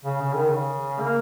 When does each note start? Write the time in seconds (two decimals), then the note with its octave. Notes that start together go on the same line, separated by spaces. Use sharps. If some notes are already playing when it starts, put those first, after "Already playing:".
0.05 C#3
0.21 C#3
0.35 D#3
0.48 C#3
1.00 A#3